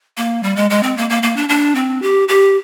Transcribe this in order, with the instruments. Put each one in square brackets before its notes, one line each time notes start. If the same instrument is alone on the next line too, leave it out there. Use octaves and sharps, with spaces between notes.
[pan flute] A#3
G3
G#3
G#3
C4
A#3
A#3
A#3
D4
D4
C4
G4
G4